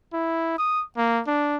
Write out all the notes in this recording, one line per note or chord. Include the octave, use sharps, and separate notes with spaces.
E4
D#6
A#3
D4